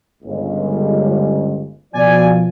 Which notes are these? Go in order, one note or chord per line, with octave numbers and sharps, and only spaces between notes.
G1 C#2
B2 F3 D5 G#5